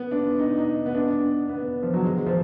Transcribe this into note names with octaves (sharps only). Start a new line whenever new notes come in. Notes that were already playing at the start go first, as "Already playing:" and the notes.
Already playing: B3
D4
D#4
D#4
B3
D4
B3
F3
F#3
G#3
F3